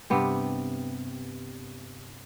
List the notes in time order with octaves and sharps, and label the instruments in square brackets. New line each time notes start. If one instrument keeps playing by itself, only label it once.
[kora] G2 C3 B3 G4